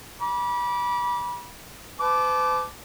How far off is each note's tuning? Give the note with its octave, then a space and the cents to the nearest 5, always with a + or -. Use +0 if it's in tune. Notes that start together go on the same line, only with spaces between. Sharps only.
B5 -30 D6 -15
B4 +45 A5 -30 D6 +0